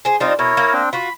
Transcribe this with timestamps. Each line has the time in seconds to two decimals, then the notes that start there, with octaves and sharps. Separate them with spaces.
0.05 G#4 C5
0.20 G3 C4 D4 D#4 F4
0.39 B2 E4 A#4 C#5
0.57 A#3
0.73 C4 D4 G5
0.93 F4 F#4 B5